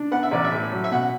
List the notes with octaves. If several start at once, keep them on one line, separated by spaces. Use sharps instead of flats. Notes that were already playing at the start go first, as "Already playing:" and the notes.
Already playing: D4
B3 F#5
E5
A1 D5
E5
A2
F#3
E5
B2 F#5